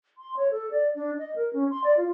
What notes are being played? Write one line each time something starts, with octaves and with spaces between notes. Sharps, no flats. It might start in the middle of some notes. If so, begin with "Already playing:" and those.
C6
C#5
A4
D5
D4
D#5
A#4
C#4
C6
D5
F4